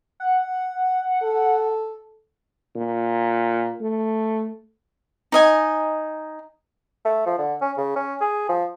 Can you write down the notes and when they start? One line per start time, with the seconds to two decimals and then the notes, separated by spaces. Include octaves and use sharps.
0.20 F#5
1.23 A4
2.75 A#2
3.81 A3
5.32 D#4 D#5 G#5
7.05 A3
7.26 F3
7.38 D3
7.61 C#4
7.77 C#3
7.96 C#4
8.21 G#4
8.49 F3